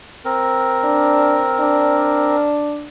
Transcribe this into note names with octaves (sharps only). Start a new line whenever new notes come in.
C4 A#4
D4
D4